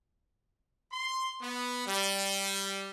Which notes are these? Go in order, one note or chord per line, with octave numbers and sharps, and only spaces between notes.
C6
B3
G3